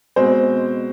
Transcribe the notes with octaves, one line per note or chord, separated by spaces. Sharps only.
B2 G#3 C4 C5